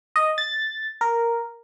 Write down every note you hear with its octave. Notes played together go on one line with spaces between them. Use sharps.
D#5
A6
A#4